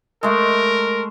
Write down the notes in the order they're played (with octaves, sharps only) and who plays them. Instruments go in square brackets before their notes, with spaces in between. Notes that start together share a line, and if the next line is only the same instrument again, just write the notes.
[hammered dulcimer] G#3 A3 [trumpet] A#4